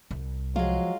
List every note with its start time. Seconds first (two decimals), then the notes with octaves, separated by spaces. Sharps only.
0.11 C2
0.56 F3 F#3 G#3 F4